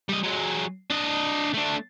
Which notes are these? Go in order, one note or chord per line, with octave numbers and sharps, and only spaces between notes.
G3 D#5
F#3 G#3
D4 D#5
A3 D4